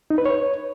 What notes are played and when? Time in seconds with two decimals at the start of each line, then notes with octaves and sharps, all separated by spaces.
0.10 D#4
0.18 B4
0.26 C#5